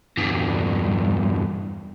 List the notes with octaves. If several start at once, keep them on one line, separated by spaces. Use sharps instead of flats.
E2 G2